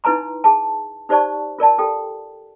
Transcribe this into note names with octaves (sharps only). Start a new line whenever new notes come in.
D#4 E4 B4 G#5 A#5 C6
G#4 A5
D#4 G4 C5 D5 A5 C#6
F4 A#4 D5 A5
F4 G4 A4 G5